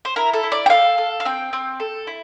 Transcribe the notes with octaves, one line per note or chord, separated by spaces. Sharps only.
C5
E4 A#4
A4
E4
D5
G5
A4 F5
A4
F5
C4 G5
C4
A4
E4